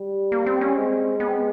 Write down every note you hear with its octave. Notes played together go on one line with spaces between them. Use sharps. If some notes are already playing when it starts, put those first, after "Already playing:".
Already playing: G3
A#3
C4
C#4
G#3 C4
B3
C4
B3